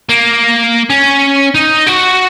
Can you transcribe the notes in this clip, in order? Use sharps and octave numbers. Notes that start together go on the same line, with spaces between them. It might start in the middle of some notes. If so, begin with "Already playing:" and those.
A#3
C#4
D#4
F#4